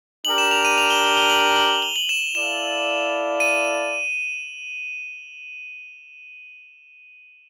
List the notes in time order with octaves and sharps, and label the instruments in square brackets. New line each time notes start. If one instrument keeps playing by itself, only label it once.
[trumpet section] D4 G4 A#4 [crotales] F#7
[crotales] E7
F7
D#7
F7
G7
G7
G7
F#7
F#7
G7
F#7
E7
[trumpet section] E4 A4 D5 F5 [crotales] E7
[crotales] D#7